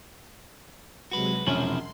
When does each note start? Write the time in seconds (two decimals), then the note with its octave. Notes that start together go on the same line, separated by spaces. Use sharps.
1.11 C3 F#3 G#3 F#4 B4
1.47 E1 C3 F3 C#4 E4 C6 F#7